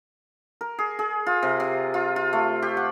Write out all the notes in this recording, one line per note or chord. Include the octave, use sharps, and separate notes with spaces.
A#4
G#4
G#4
F4
C3
C3
F4
F4
A3
G4
F#5